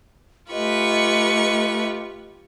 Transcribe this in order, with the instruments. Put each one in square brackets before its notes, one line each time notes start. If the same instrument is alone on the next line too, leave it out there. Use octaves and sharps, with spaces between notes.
[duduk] A3 [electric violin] F4 G4 [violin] B4 C#6 [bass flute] D#5